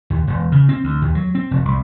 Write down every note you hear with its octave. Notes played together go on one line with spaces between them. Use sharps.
D#2
E1
C#3
C4
D2
D#2
F#3
C4
F1
C2